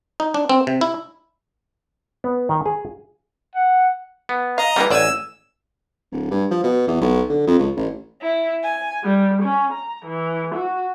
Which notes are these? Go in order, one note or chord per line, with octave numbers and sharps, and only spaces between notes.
D#4
D4
C4
C3
E4
B3
D#3
G#4
F#5
B3
D#5 F5 A#5
C#3 E3 G3 A#3
A1 F#3 D5 G#5 E6
D1
G2
F3
B2
E2
B1
D3
F2
C#2
A1
E4
G#5
G3
C#4
A#5
E3
F#4